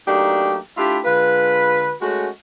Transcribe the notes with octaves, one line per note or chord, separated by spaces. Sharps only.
F#3 A3 A#3 D4 D#4 G4
A3 D4 E4 F4 G4
D3 G#3 F4 B4
G#3 A3 C#4 F#4